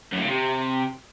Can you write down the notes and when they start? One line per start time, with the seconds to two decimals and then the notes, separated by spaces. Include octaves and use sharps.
0.13 F#2
0.18 A2
0.23 C#3
0.28 C3